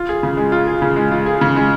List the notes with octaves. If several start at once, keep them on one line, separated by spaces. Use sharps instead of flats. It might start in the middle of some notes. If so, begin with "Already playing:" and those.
Already playing: F4
G#4
C#3
G#3
F4
G#4
C#3
G#3
F4
G#4
C#3
G#3